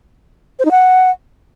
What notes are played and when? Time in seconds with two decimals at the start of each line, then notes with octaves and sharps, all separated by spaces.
0.59 C5
0.65 D#4
0.71 F#5